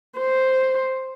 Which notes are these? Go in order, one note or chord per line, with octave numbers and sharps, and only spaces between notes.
C5